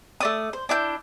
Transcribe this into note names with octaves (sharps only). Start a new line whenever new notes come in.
A3 D5 D#6
C5
D4 E4 G6